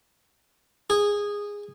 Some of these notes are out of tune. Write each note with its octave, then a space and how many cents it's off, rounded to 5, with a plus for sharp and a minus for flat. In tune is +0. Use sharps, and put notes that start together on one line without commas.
G#4 -15